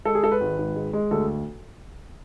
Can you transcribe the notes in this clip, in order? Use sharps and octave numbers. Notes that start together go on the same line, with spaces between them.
G#3 A4
G#4
G#3 A4
B4
G#1
G#1
G#3
G#3
D2 A4